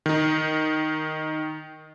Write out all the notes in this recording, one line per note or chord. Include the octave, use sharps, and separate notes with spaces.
D#3 D#4